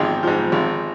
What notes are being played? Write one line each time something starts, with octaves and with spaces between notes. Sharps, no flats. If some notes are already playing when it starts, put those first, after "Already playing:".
Already playing: G#1 G#2 F3 D#4 G4 G#4
G#2 F3
G#1